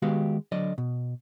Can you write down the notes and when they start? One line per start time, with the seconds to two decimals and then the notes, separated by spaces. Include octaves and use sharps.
0.02 D#3 G#3 B3 F#4 G4 F5
0.52 D3 F#3 D5 D#5
0.78 B2